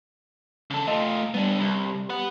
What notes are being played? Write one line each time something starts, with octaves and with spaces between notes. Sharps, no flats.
C#3 A4
A3 F4 D#5
G3 B3 D4
C2
B4 F#5